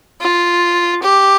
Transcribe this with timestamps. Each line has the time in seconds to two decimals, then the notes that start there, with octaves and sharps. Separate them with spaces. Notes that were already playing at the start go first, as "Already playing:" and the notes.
0.21 F4
1.02 G4